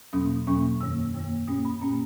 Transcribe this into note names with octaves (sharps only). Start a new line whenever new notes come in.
E2 B2 F#3 A#3 C#4 D#6
E2 B2 F#3 A#3 C#4 C#6
F#2 D#3 A#3 E6
F#2 D#3 A#3
A#2 A#3 C#4 D#6
B5
A#2 A#3 C#4 A#5